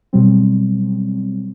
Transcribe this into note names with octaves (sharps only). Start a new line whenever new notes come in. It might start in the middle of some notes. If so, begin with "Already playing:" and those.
B2 F#3 G3 C4